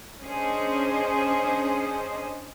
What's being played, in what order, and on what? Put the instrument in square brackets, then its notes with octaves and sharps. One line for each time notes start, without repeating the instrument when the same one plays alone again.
[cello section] C#4 D4 G#4 C5 D#5